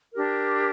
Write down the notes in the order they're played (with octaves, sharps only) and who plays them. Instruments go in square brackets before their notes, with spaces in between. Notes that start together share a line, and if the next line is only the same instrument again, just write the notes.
[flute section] D4 G4 A#4